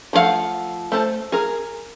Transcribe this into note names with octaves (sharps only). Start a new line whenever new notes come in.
F3 A3 E4 F5 F#5
A3 C5 A5
G#4 A#4